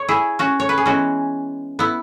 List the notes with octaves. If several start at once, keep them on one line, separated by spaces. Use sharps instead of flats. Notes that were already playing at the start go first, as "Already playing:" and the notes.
Already playing: C#5
E4 G#4
C#4 F#4
C#5
B4
G#4
E3 G#3 B3 C#4 F#4
B3 E4